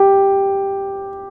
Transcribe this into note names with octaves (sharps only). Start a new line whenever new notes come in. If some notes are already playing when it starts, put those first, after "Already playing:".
Already playing: G4